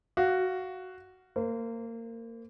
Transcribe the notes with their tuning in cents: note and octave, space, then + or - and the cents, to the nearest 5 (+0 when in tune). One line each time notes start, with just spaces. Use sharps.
F#4 +5 F5 -10
A#3 -25 C5 -40